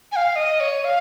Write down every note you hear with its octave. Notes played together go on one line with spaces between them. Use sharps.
G#5
F5
D#5
C#5
F5